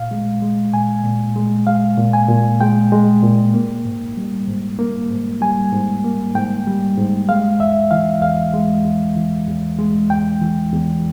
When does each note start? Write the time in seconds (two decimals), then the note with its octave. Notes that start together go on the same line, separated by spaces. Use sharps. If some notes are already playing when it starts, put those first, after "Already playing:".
Already playing: A#2 F5
0.11 G#3
0.42 G#3
0.73 A#2 G#5
1.04 A#2
1.36 G#3
1.67 G#3 F5
1.98 A#2
2.13 G#5
2.29 A#2
2.61 G#3 G5
2.92 G#3
3.23 A#2
3.54 A#3
3.85 G#2
4.17 G3
4.48 G#2
4.79 A#3
5.10 G#2
5.41 G3 G#5
5.72 G#2
6.04 A#3
6.35 G#2 G5
6.67 G3
6.98 G#2
7.29 G#3 F5
7.60 E2 E5
7.91 E3 F5
8.22 E2 F5
8.53 G#3
8.85 E2
9.16 E3
9.48 E2
9.78 G#3
10.10 E2 G5
10.41 E3
10.72 E2